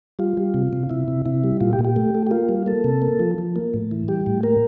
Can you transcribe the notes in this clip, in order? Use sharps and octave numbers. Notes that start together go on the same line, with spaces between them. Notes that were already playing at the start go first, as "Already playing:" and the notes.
G3 F4
G3
C3
C3
C3 E4
C3
C3 E4
G3
A#2 F4
G4
A#2
G4
A3
A3
G4
A#3 F4
G3
A#3 A4
C3
A#3
F3
F3
A#3
A2
E3
G3 G4
A2
A#3 A#4